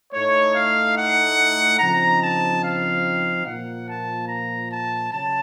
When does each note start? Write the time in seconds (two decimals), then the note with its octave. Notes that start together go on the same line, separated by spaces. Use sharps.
0.12 A2 A3 D#4 C#5
0.54 F5
0.96 F#5
1.79 C#3 F3 C4 D#4 A#5
2.20 A5
2.61 F5
3.44 A#2 F3 A#3 F#5
3.87 A5
4.28 A#5
4.70 A5
5.11 C#3 F#3 A5